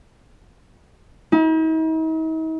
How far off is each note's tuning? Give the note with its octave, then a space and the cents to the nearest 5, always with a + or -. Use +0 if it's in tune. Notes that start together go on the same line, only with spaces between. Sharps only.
D#4 +45